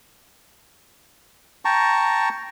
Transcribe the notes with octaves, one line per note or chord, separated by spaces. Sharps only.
G5 A5 A#5 C#6